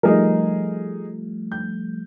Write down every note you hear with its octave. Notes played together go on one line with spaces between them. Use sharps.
F3 G3 A3 D#4 G#4 A#4
G6